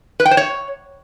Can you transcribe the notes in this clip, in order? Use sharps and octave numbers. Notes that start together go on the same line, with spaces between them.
B4
G5
C5
C#5